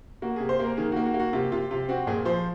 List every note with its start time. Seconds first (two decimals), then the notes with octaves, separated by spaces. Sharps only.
0.22 A#3 F#4
0.36 C3 G#4
0.49 C5
0.60 A#3 A#4
0.77 D#3 G#4
0.92 A#3 F#4
1.06 F#4
1.14 A#3
1.20 F#4
1.33 C3 F4
1.52 C3 F4
1.71 C3 F4
1.89 C4 F#4
2.07 A#2 G#4
2.25 F3 C5